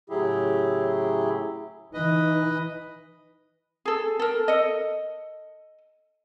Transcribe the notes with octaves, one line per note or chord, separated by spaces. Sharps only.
A2 C#3 F#3 E4 G4 G#4
E3 D#4 B4 D#5
G#4 A4
A4 A#4
A4 D#5